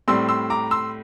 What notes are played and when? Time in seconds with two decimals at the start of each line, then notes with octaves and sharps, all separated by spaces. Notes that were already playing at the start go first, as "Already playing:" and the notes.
0.08 A2 G3 C4 C6 E6
0.29 C6 E6
0.50 A#5 D6
0.71 C6 E6